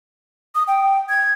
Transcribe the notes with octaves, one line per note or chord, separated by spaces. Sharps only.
D#6
G5
G#6